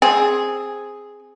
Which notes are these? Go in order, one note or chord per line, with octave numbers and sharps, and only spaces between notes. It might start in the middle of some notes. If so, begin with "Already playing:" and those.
C4 G#4